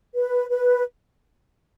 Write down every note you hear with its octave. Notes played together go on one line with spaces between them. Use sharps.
B4
B4